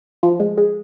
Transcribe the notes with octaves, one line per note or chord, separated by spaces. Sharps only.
F3
G#3
G#3